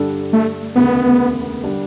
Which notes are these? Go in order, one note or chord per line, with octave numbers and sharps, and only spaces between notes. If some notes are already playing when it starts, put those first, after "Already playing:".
Already playing: G2 D3 G3 D4 A4
A3
E1 D2 C#3 B3
D3 G3 D4